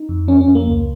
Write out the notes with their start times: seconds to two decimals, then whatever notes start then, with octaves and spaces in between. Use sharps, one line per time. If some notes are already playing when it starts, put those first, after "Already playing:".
Already playing: D#4
0.09 F2
0.28 F3 C#4
0.41 C#4
0.48 F2
0.55 A#3
0.68 C#2